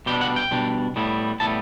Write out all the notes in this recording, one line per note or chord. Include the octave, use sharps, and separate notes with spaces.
B2 G3 D4 G4
F#5
G5
B2 G3 D4
A2 G3 B3 E4
A2 G3 B3 E4 A5